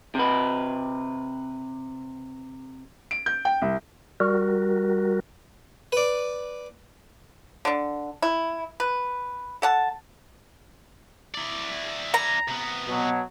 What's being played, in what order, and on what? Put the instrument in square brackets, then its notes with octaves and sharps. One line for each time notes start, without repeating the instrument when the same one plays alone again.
[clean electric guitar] C3 B4
[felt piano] D7
G6
G5
C2
[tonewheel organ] G3 F#4 A#4
[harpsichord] B4 D5
[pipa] D3 D4
E4
B4
A4 F#5 A5
[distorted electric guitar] E4 D5
[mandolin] A#5
[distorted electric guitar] C3 B3
[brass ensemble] B2 F#3